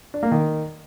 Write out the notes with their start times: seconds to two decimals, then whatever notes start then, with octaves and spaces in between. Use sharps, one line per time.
0.14 D4
0.23 A#3
0.32 D#3